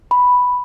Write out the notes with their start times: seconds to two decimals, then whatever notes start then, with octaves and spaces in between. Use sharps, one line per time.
0.11 B5